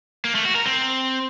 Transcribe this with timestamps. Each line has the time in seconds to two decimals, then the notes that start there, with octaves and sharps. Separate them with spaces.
0.25 A#3
0.35 A3
0.45 F#4
0.55 A#4
0.66 C4